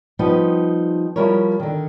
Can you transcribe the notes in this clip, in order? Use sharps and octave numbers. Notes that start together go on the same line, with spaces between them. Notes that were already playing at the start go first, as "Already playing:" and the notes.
F3 G3 B3 D#4 G4
F3 G3 E4 A#4 C#5
D3 D#3